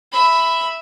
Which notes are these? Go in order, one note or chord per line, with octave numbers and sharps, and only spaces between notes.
E5 B5